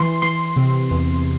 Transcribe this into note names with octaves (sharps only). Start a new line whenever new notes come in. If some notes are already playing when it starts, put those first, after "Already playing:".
Already playing: E3 C6
E3 C6
C3
E2